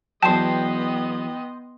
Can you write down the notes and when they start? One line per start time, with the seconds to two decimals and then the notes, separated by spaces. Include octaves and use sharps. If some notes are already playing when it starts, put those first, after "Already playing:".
0.23 E2 F#3 B3 D#5 G5 A5 C6 E7